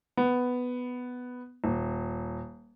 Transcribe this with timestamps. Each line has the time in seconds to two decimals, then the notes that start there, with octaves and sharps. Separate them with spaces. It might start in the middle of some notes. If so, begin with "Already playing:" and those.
0.17 B3
1.64 D#1